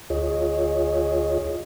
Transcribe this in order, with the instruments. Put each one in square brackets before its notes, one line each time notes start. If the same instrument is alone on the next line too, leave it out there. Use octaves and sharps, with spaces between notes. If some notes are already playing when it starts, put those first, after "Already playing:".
[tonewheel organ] D2 F4 G#4 C#5 D#5